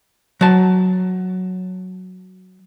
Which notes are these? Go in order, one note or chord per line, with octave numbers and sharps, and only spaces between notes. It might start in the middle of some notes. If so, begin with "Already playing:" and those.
F#3 A5